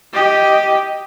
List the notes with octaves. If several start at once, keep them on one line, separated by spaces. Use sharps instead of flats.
G4 D#5